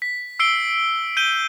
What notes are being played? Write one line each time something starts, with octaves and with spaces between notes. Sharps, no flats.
B6
E6 C7 D7 G7
G6 D#7 G7